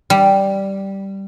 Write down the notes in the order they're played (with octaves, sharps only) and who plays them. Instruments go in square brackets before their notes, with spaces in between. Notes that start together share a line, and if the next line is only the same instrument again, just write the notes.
[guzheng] G3